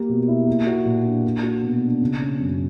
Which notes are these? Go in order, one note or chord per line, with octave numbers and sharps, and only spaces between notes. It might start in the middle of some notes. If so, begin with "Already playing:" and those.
Already playing: A#3 G4
B2
E4
A#3
F#4
A#2
D4
A#3
F#4
B2
D4
C#3
C#4
F#2